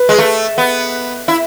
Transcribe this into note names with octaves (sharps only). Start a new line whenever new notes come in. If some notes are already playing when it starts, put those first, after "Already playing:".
Already playing: B4
G#3
A3
B3
E4